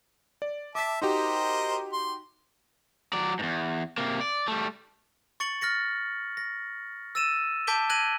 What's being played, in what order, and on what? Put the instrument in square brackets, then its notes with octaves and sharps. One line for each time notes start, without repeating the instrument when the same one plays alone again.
[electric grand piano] D5
[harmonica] E5 A5 [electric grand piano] D6 B6
[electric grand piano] D#4 F#4 G4 [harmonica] A#4 C5 D#5
[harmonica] C6
[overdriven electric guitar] F#3 D5
E2 G#2
C3 A#3
D5
G3 A3
[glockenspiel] C#6 A6 C#7 F#7
F6 A6 A#6 C#7
A#6
E6 A6 D#7 E7
A5 D6 G6 B6 D7 G7
F#6 G#6 A#6 D#7 F#7